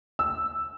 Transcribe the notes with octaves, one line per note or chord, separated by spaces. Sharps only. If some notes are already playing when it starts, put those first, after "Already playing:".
E6